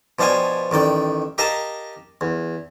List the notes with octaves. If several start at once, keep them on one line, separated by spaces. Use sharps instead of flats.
B2 F3 D4 F5 G5 G#5
A1 D#3 D5 G5
G4 A#4 D#5 F5 A5
E2